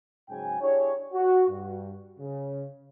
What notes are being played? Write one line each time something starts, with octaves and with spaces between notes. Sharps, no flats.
G#2 C#3 F#3 G5 G#5
D4 E4 G4 G#4 C#5
F#4
G2
C#3